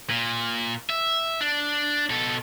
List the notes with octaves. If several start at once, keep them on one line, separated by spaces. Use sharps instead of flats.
A#2
E5
D4
B2 A4